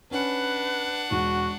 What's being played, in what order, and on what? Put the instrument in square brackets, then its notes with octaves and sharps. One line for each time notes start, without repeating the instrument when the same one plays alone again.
[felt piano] C#4 [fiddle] D4 F#5 [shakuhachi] B4
[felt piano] E1 [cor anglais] F#4